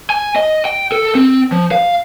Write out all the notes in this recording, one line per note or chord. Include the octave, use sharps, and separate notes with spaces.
G#5
D#5
G5
A4
C4
F3
F5